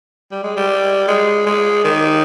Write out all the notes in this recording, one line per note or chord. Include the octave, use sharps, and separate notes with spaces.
G3
G#3
G3
G#3
G#3
D#3